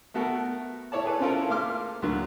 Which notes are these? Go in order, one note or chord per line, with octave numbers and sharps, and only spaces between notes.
A3 B3 F#4 A4 A#4
E4 C#5 D5 A5
G#4 A4 B4
C4 C#4 E4 F4 A4 A#4
A3 A#3 F5 C6 D6 F6
D2 D3 F#3 A#3